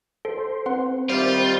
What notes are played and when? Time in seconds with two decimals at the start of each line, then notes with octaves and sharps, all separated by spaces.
0.25 A4 C5
0.66 C4 B4 F#5 C6
1.10 D#3 G3 F4 C5 E5